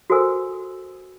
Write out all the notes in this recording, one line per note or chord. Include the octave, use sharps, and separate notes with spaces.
F#4 A4 A#4 C5 G#5 E6